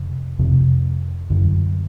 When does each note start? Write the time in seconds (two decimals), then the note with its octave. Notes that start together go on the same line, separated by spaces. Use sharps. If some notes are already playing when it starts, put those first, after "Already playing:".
Already playing: F2 C3
0.39 F2 C3
1.30 F#2 D3